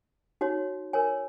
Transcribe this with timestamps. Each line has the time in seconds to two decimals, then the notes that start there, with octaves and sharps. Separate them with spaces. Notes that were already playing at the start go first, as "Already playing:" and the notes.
0.41 D#4 F#4 C#5
0.93 A#4 C#5 G#5